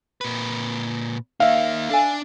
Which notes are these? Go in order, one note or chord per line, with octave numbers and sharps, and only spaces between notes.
A#2 B4
A#3 D#4 E5 F5
D4 A4 G#5